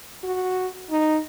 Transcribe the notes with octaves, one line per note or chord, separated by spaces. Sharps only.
F#4
D#4